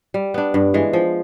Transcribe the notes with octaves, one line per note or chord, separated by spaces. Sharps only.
G3
B3 D4
G2
E3 G#3
F3